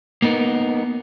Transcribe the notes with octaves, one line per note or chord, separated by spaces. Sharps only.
A#3 B3 D#4 A#4